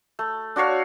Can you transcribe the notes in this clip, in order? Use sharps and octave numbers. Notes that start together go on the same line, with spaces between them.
A3
D4 F#4 C#5 F5